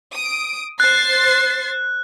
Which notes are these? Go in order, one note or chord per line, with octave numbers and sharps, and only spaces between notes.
D#6 D7
C5 F#6 A6 C7